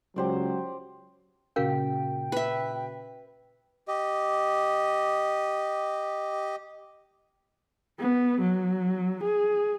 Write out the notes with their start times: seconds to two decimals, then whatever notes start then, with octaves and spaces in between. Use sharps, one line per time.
0.16 C#2 F#3 G4 C5 D5
1.56 A#2 C#3 C#4 F#4 A#4 F5 G5
2.32 B4 E5
3.88 G4 D#5
8.00 B3
8.42 F#3
9.23 G#4